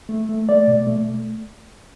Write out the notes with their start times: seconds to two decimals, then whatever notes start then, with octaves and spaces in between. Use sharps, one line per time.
0.09 A3
0.29 A3
0.49 A3 D5
0.68 B2
0.87 A3